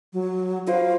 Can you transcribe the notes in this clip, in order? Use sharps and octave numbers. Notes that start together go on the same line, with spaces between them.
F#3
F4 F#4 C5 F5